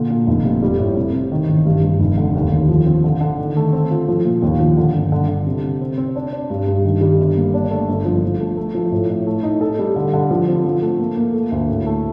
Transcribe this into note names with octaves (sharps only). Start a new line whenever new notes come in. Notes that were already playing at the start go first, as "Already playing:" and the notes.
Already playing: A#2 D3
A#2
F1
C3
G3
A2
C3
C3
D#3
A1
G2
G2
F1
D3
D#2
D#2
F3
C4
D3
D3
D#3
A3
C4
F4
F3
A#2
D#2
F3
D3
G1
D3
D3
C3
C3
C4
C4
D4
D4
G2
G2
D#3
G3
G1
A#3
D4
A3
G1
F3
F3
A3
A3
F3
A2
A2
A3
D#4
A4
G3
D3
D3
F3
C4
F3
A3
A#3
A#3
A3
D2
A2
A3